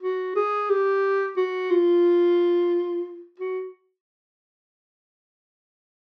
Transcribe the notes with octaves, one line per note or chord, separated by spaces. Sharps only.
F#4
G#4
G4
F#4
F4
F#4